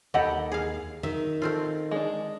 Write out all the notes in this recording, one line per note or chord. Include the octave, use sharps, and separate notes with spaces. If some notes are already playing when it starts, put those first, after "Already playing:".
D#2 G4 A4 D#5 F#5 B5
G#4 F5
D#3 E5
A3 C4 F4
G#3 D4